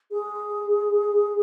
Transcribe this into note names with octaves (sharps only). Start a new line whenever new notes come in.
G#4